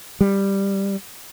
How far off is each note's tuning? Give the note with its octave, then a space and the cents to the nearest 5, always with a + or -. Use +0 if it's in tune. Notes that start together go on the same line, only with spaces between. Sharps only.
G3 +5